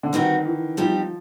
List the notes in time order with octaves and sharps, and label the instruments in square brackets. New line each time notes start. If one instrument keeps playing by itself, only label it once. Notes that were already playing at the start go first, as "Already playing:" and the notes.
[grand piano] D3
[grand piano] D#3 [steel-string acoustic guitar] G3 C4 D#4 F#4 B4
[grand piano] E3
[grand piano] F3 [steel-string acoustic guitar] G3 C4 D#4 G4